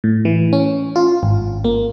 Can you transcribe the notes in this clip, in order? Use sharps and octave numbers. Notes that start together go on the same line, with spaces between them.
A2
E3
C#4
F4
G#1
A#3